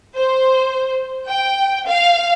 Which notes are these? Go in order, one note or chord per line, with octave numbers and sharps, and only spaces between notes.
C5
G5
F5